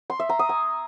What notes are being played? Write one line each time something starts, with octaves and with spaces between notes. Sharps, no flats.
C6
E5
A#5
D#6
G#5